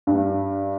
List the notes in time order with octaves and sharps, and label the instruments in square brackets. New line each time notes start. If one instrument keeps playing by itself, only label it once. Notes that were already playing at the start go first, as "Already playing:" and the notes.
[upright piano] G2